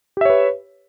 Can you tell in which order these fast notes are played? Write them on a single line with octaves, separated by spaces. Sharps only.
G4 E5 C#5 B4